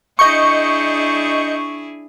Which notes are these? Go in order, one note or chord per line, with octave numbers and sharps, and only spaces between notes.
D4 E4 G#4 D#5 C#6 G6 C#7